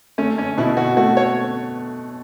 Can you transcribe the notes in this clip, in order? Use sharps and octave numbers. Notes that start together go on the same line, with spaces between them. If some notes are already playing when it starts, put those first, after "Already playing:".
A3 C#4
C#4
B2 E4
F#4
A3 F#4
C#5